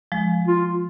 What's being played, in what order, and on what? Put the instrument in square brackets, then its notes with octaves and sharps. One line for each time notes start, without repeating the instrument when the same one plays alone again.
[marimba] F3 G#3
[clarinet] F4